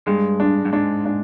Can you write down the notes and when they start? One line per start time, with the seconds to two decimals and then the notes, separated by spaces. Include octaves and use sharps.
0.07 G2 G#3
0.40 D4
0.65 G2
0.73 G#2 D4
1.05 D4